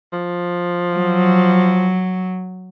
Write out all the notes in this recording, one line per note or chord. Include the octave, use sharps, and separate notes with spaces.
F3
F#3